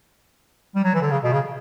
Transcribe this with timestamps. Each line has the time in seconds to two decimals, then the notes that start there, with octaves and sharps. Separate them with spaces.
0.75 G3
0.84 F#3
0.94 E3
1.02 D3
1.11 C#3
1.24 B2
1.32 C#3